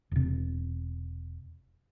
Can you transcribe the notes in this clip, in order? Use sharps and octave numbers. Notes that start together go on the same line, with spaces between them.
E1 C3